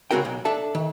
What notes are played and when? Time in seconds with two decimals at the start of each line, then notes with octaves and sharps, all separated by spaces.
0.11 C#3 G#3 C4 F#4 A#4 G5
0.25 B1
0.45 D4 A4 E5 A5
0.75 D#3